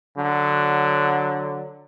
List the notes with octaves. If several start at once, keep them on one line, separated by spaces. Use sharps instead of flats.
D3 F#3